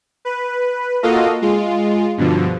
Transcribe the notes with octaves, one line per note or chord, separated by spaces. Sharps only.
B4
A#3 F4 F#4 A4 D#5 F5
G#3 F4
G2 B2 D3 F3